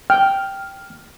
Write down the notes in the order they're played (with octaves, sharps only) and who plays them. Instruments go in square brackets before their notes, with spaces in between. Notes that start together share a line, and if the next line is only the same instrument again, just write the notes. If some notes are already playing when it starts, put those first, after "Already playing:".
[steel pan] G5 [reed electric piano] F6